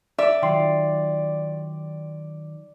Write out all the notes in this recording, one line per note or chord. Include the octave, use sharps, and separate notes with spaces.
D5 E5
D#3 F#3 F4 G5 C6 C7